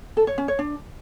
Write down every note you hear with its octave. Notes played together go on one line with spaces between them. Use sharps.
A4
C#5
C#4
C#5
D4